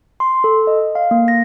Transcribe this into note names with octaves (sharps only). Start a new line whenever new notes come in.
C6
A4
D#5
F5
A#3
A#6